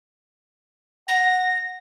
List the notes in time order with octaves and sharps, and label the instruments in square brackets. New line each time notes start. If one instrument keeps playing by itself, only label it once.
[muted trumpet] F#5 [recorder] A#6